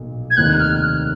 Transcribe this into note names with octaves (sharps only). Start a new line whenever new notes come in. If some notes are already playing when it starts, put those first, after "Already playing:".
Already playing: B1 A#2 F3
G#6
F1 D#2 D#3 F#6
F#6
F6
F#6